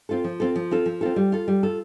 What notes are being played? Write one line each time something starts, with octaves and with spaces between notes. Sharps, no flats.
C4 F4 A4
F3
C4 F4 A4
F3
C4 F4 A4
F3
C4 F4 A4
G3
F4 A4
G3
F4 A4